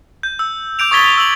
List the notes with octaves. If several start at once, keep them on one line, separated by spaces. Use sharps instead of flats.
G6
E6
D6 G6 D7 F7
C#6 D#6 G#6 A6 B6 G7
E6 F#7